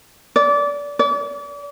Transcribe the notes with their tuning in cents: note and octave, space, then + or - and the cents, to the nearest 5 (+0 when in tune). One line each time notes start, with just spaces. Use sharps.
D5 -25
D5 -40